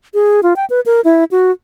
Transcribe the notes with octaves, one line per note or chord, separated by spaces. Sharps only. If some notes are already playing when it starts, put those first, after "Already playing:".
G#4
F4
G5
B4
A#4
E4
F#4